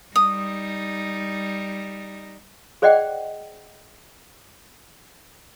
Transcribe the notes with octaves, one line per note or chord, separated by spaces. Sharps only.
G3 D#4 D#6
G#4 C5 D5 D#5 F#5 G5